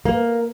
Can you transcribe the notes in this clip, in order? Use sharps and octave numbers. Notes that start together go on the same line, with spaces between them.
A#3